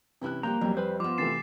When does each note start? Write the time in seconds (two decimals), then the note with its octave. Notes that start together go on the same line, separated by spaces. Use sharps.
0.21 C3 E3 C#4 E4 F#6
0.43 F3 G3 A#3 G4 A#5 G6
0.61 F2 F#3 G3
0.77 B4 C5 G#5
1.00 F3 B3 F4 D6
1.18 C3 E3 A3 A6 C7 E7